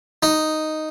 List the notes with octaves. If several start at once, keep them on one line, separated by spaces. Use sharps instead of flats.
D#4